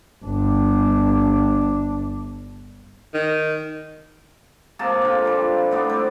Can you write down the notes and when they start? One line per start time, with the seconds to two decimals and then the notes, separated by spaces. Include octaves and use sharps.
0.24 G1 D4
3.14 D#3
4.79 C3 G#3 A#3 A5
5.02 D3 F4
5.25 F3 G3
5.71 A2 B3 D5
5.90 G3 C4